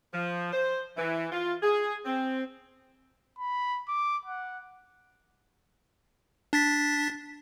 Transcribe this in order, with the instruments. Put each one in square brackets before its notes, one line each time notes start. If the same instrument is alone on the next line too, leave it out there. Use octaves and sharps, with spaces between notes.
[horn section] F3
C5
E3
F4
G#4
C4
[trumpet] B5
D6
F#5
[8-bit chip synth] D4 A6 B6